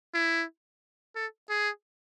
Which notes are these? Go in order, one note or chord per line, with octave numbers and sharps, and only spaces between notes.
E4
A4
G#4